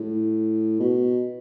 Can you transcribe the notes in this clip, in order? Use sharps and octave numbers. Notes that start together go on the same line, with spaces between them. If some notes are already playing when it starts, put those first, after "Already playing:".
Already playing: A2
B2